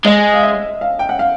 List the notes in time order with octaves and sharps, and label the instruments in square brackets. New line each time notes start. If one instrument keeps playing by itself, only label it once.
[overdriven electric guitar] G#3 [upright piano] D#5
[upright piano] F5
E5
F5
G5
F#5
F5